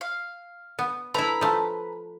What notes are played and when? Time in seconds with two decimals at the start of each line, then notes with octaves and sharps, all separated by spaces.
0.01 F5
0.79 B3
1.14 A3 E4 B4 A#5 B5
1.41 F3 A3